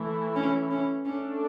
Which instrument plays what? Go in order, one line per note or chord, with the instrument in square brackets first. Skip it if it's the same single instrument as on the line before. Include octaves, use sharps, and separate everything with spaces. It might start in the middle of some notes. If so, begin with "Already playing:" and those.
Already playing: [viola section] E3 A3 E4
[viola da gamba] C#4
C#4
[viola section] A3 D4 A4 [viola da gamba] C#4